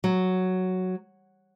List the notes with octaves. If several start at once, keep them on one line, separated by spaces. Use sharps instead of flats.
F#3